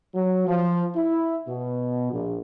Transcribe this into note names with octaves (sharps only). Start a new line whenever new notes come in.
F#3
F3
E4
B2
A#1